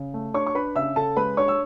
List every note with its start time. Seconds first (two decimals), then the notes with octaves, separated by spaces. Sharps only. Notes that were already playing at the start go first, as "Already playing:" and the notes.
Already playing: C#3
0.14 A3
0.34 D4 C#5 C#6
0.46 C#6
0.55 D4 B4 B5
0.75 C#3 E5 E6
0.96 C#3 A4 A5
1.17 G#3 B4 B5
1.37 D4 C#5 C#6
1.48 E6